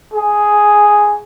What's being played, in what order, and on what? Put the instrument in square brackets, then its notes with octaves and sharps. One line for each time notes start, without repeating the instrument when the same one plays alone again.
[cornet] G#4